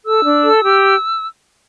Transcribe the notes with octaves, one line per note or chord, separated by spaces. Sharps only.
A4 E6
D4
A4
G4